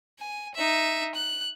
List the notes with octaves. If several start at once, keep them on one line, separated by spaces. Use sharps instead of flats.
G#5
D#4 E5
F#6